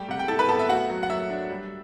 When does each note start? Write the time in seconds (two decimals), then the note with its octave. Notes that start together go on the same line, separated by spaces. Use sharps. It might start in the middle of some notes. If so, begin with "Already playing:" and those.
Already playing: G3 A3 G4 G5
0.08 C3 F#5
0.19 G5
0.28 E4 A4 A5
0.39 B4 B5
0.49 B3 A4 A5
0.59 E5
0.69 A3 F#4 F#5
0.90 F#3
1.03 F#5
1.10 F#3 E5
1.30 D4
1.50 G3